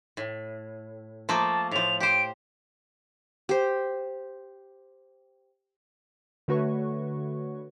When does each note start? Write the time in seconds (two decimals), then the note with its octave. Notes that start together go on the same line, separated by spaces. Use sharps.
0.17 A2
1.29 F3 A3 A#3 A5
1.71 A2 F3 F7
2.00 G4 C5 D7
3.49 G4 C5
6.48 D3 A3 F#4 B4 C#5 C#6